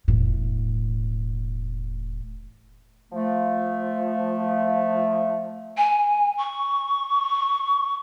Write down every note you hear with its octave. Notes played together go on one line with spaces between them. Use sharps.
E1 A2
F3 A3
G#5
C#6